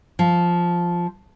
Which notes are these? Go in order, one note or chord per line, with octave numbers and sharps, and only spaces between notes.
F3